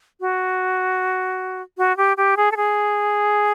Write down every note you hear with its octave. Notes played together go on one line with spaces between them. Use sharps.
F#4
F#4
G4
G4
G#4
A4
G#4